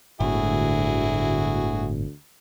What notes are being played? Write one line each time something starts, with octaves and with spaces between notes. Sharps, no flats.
G1 D2 A2 G#3 E4 F#4 G#4